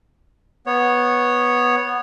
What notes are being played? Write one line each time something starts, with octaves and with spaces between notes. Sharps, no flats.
B3 C#5